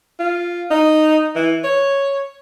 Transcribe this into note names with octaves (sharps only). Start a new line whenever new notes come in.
F4
D#4
E3
C#5